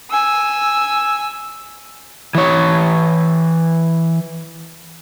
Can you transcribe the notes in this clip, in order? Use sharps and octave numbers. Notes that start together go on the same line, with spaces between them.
G#5 E6
E3 C#5